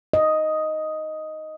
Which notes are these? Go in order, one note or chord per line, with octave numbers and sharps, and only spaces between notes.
D#5